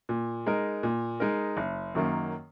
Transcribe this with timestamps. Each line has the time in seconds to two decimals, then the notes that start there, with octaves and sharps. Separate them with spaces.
0.09 A#2
0.46 G#3 D#4 A#4
0.83 A#2
1.20 G#3 D#4 A#4
1.57 F#1
1.95 F#2 D#3 F#3 A#3